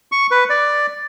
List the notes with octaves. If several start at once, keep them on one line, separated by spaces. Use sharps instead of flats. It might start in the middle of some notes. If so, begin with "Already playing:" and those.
C#6
B4
D5